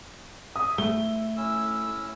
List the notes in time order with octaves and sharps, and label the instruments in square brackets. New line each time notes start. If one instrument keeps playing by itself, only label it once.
[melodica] D#5 E5 G#5 [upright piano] D#6
[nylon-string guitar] A3 [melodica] E4 [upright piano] G7
[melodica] C#4 E4 E6